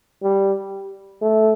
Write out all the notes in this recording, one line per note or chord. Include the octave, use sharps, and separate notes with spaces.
G3
A3